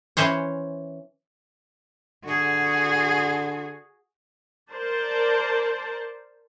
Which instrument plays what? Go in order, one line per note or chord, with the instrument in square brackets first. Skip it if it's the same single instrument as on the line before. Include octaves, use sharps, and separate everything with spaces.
[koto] E3 C#4 C5 C#5
[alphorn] D3 [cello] F#4 G#4
[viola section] A#4 C5 D5 A5